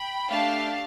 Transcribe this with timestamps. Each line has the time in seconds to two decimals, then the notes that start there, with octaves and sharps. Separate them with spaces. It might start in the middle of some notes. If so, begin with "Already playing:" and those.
Already playing: G5 B5
0.29 A3 D4 G4 F5 A5